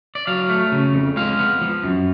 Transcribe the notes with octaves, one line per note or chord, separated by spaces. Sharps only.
D5
F#3 F5
A3
C#3
F2
G#3 F5
B3
F3
F#2